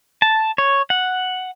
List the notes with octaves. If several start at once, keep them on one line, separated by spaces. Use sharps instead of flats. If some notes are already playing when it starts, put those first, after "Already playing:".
A5
C#5
F#5